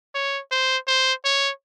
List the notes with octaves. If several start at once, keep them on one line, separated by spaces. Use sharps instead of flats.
C#5
C5
C5
C#5